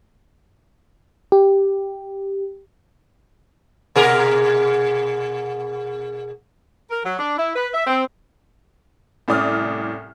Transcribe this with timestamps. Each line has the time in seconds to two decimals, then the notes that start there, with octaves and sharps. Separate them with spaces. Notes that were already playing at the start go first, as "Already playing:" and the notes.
1.32 G4
3.96 B2 G#4 A#4
6.90 A#4
7.05 F#3
7.19 D4
7.37 E4
7.56 B4
7.74 E5
7.87 C4
9.28 C2 A2 C#4 D5 D#6 F6